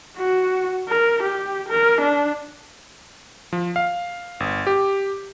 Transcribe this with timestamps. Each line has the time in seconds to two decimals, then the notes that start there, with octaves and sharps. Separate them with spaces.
0.17 F#4
0.88 A#4
1.23 G4
1.69 A#4
2.01 D4
3.53 F3
3.76 F5
4.40 G1
4.67 G4